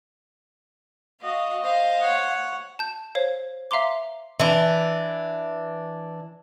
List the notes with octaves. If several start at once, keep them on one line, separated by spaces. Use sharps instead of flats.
F#4 D#5 F5
C5 F5
C#5 F#5
A5 G6
C5 C#5 F5
E5 F5 A#5 C6 D6
E3 D4